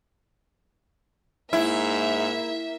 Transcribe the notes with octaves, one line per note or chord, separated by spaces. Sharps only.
G#2 A#3 E4 E5